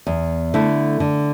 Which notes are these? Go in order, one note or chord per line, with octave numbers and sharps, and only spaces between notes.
E2
D3 A3 E4
D3